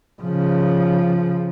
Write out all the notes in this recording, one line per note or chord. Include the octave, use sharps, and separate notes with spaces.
C#3 F3